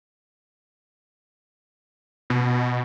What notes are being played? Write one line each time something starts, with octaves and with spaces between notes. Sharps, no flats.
B2